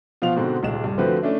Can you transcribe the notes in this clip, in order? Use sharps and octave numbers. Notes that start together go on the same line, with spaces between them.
B2 F3 F4 F5 F7
G#2 B2 D3 C4 F#4
D#1 C#2 E7
C2 G2
D3 F3 A3 C4 F#4 B4
A3 C#4 D4 E4